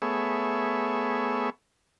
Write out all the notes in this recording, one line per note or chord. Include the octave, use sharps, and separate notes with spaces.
A3 B3 G#4 C#5 E5